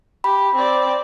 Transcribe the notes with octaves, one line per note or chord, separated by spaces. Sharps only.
G4 B5
C4 D5